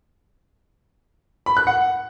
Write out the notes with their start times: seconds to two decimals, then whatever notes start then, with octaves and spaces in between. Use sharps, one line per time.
1.46 B5
1.57 F#6
1.67 F#5